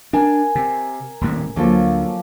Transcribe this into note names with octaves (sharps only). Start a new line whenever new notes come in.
D4 A#4 G#5
C3
D#1 A2 C3
D2 F3 F#3 A#3 A4 D6